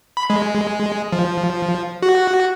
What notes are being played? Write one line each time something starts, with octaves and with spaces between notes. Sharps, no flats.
B5
G#3
F3
F#4